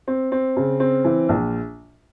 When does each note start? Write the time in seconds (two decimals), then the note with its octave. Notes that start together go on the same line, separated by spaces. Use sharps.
0.08 C4
0.32 C4
0.57 C#3
0.80 C4
1.05 E3
1.29 A#1